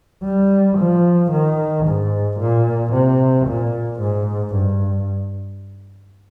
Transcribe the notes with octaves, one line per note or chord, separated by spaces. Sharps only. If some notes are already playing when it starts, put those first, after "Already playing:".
G3
F3
D#3
G#2
A#2
C3
A#2
G#2
G2